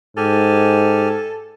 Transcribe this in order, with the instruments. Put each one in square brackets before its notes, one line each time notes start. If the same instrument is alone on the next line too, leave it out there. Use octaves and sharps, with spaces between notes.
[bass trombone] G#2 [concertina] G4 G#5 F6 [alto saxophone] A4